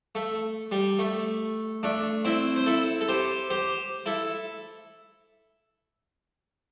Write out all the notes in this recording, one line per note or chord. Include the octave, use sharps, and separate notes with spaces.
A3
G3
A3
A3 D4
C4 E4
C5
E4 A4
A4
G4 C5
G4 C5
E4 A4